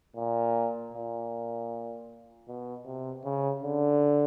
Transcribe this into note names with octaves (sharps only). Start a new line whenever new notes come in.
A#2
A#2
B2
C3
C#3
D3